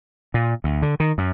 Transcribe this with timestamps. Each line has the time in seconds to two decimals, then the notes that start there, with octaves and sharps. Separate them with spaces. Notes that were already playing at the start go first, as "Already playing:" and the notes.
0.34 A#2
0.64 D2
0.82 D3
1.00 D#3
1.18 F#2